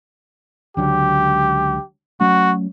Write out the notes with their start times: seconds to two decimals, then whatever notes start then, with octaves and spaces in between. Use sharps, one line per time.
0.77 C#2 D3 F#3 G4
2.21 F#3 A3 C#4 F#4